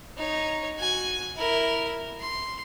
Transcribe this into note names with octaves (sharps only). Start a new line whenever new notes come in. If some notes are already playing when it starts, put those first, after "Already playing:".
D#4 C#5
F#4 G#5
E4 A#4
C6